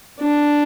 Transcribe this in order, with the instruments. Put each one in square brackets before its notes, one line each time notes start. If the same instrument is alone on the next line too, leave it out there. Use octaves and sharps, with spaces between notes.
[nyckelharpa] D4